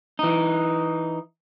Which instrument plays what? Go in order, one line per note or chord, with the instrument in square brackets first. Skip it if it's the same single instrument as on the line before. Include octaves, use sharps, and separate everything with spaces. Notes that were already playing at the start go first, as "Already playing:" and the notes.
[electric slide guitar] E3 D#4